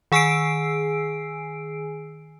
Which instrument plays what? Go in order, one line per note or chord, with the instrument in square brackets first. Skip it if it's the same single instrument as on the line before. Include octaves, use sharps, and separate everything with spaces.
[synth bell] D#3 G#4 G#5 E6 C7 D7